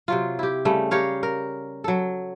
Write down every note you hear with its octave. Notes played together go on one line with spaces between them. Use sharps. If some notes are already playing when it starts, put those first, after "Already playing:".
C3 F#3 F4
E4 G4
C#3 G3 A3
G4 A#4 C#5 F5
A#4
F#3 A4